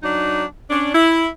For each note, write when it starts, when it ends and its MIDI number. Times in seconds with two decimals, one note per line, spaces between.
0.02 0.44 54
0.02 0.44 62
0.02 0.44 63
0.69 0.90 61
0.69 0.90 62
0.93 1.27 64